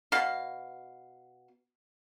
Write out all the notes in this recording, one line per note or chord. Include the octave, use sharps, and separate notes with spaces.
B2 F5